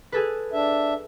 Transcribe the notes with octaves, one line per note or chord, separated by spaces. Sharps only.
G#4 A4 B4
D4 E5